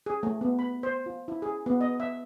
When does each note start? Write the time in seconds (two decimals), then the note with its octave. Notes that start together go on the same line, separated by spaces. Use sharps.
0.06 G#4
0.23 A3
0.41 B3
0.59 B5
0.83 C5
1.06 F4
1.28 E4
1.42 G#4
1.66 B3
1.81 D#5
2.00 E5